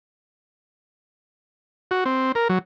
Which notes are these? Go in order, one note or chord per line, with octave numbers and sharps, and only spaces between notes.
F#4
C4
A#4
F#3